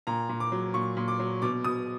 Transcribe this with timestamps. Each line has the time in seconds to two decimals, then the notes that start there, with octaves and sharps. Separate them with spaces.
0.07 A#2 A#5
0.29 A#2
0.40 D6
0.52 F#3
0.74 A#2 C#6
0.97 A#2
1.08 D6
1.19 F#3
1.42 B2 D6
1.64 B2 D#6